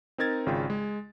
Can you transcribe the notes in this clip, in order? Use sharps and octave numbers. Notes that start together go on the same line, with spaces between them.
C4 D#4 A#4 G#6 A6
G#1 C#3 F4 G5
G#3